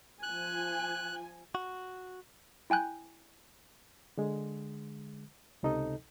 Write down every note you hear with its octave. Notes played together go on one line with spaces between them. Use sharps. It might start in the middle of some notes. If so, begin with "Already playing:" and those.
F3 G#5 F#6
F#4
E4 G5 G#5 F#6 G6
D3 G#3
C#2 C3 D#4 A4 D#5